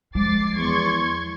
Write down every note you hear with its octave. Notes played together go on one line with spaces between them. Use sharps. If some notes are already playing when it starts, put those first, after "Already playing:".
F3 G#3 D6 A6 C7
E2 C6 C#6 G#6